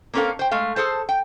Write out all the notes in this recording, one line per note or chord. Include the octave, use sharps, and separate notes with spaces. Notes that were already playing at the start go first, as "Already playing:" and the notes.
A#3 C4 C#4 A4 A#4 F5
C5 G5
G#3 A3 F5
G#4 A4 C5 A5
G5